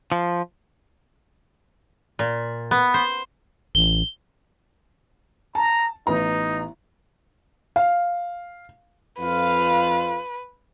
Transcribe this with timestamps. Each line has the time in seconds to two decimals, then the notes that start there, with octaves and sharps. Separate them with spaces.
0.12 F3
2.19 A#2
2.71 B3
2.94 C5
3.75 A1 G7
5.55 A5 A#5
6.07 A1 B3 D#4 A#5
7.76 F5
9.19 F2 F4 B4 F5